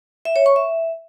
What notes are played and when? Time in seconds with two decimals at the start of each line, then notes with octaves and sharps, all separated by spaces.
0.25 E5
0.36 C#5
0.46 C#6
0.56 E5